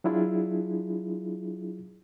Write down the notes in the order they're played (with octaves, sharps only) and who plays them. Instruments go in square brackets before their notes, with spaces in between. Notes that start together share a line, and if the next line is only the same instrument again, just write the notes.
[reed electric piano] F#3 D4 E4 F4 G#4